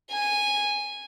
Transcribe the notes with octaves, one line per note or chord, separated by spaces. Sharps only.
G#5